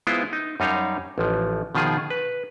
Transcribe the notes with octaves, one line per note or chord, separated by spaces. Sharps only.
G#3 B3 E4 F4 C5
D#4
F#2 G3 D#4 C#5 F5
A1 F3
B2 D#3 F3 F4 G#4
B4